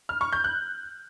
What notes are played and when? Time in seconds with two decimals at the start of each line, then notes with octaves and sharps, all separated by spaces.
0.09 F6
0.21 C#6
0.33 G6
0.44 F#6